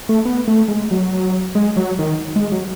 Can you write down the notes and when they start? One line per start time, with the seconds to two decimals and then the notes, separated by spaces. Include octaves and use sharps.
0.09 A3
0.25 B3
0.48 A3
0.68 G#3
0.91 F#3
1.55 G#3
1.76 F#3
1.99 D#3
2.36 G#3
2.52 F#3